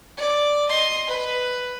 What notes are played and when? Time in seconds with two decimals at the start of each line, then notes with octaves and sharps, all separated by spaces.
0.17 D5
0.69 D#5 C6
1.07 B4